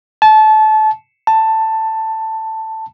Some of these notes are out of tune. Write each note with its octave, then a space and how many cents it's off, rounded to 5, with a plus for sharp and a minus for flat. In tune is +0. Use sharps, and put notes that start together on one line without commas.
A5 -25
A5 +10